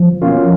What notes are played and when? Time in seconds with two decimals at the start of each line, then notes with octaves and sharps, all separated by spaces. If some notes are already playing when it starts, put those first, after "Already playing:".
Already playing: F3
0.21 B2 A#3 C#4 F4